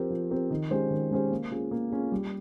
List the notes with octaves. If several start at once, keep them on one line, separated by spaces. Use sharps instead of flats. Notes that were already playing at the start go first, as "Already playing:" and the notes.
Already playing: F3 C4 G4 A#4
F3
C4 G4 A#4
D#3
G#3 C#4 G4 C5
D#3
G#3 C#4 G4 C5
A#3
C#4 F4 G#4
A#3
C#4 F4 G#4
G3